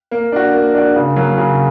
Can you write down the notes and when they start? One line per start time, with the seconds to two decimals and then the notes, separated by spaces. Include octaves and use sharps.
0.11 A#3
0.32 D4 F#4
0.54 A#3
0.75 D4 F#4
0.96 C#3
1.16 F#3 A#3
1.38 C#3